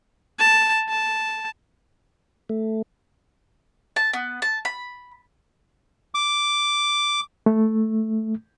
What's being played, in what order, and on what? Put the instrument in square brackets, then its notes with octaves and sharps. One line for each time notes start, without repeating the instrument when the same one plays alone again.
[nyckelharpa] A5
A5
[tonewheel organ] A3
[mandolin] A5
B3
A5
B5
[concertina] D6
[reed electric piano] A3